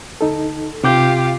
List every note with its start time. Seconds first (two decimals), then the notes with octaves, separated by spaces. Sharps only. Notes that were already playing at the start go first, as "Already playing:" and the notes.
0.21 D2 D#4 A4
0.84 C3 F4 G4 D6 G6